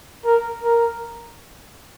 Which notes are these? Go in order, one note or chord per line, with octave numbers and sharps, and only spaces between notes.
A#4
A#4